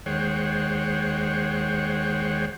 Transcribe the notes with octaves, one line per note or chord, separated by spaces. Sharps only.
D#2 G#3 C5 C#5 F#5 G5